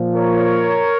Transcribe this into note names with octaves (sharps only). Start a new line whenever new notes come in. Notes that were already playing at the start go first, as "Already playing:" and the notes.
Already playing: A#2 F3
A#4 C#5